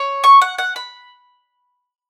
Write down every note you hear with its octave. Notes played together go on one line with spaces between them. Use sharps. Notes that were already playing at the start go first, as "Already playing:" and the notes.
Already playing: C#5
C#6
F#5
F#5
B5